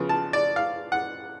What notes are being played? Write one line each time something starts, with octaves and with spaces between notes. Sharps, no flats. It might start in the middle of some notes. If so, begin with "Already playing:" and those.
Already playing: C#3 F3 B3
A5
D5
F5
F#5